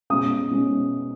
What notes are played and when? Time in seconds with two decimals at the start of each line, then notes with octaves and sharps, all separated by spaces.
0.10 B2 G#3 C#4 D#6
0.51 B2 G#3 C#4